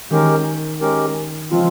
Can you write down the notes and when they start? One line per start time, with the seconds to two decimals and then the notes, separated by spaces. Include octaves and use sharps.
0.11 D#3 G#3 C#4 G4 A#4
0.81 G#3 C#4 G4 A#4
1.51 C#3 F3 G#3 C4 F4